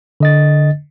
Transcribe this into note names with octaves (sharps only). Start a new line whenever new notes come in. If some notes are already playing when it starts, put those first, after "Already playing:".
D3 D#5 A6